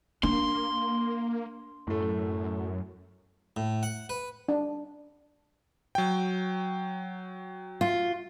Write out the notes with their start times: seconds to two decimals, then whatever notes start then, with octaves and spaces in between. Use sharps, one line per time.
0.23 A#3 D4 C6
1.87 F#2 A2 A3
3.57 A2
3.83 F#5
4.09 B4
4.48 D4
5.95 F#3 G5
7.81 F4